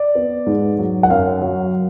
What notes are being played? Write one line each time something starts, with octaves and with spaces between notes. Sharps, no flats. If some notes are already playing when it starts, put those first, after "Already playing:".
Already playing: D5
B3
G#2
F#3
F#5
F#2 F5
F#3